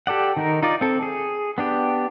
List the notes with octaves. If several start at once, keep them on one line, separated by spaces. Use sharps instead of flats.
G4 A4 D5 F#5
D#3 D#4 A#4
D#4 F4 D5
C4 A4
G#4
B3 D4 G4